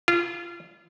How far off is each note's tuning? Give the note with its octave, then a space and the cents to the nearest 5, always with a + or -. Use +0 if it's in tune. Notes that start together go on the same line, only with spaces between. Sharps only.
F4 -25